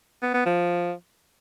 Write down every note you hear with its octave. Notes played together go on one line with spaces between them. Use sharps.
B3
B3
F3